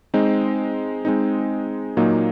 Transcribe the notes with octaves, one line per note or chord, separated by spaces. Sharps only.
G#3 C4 D#4
G#3 C4 D#4
A#2 F#3 A#3 D#4